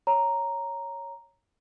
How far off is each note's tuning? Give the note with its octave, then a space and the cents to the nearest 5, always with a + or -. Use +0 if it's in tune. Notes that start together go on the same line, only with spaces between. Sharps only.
C#5 +0 A#5 +0